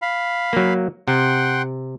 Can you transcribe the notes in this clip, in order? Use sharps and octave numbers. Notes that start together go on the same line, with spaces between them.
F5 B5
F#3 A#3
C3 F#5 G5 C6